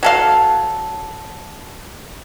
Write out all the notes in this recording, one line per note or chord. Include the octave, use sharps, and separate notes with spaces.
F#3 A4 F5